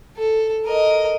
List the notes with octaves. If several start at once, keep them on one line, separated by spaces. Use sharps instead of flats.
A4
A#4 D#5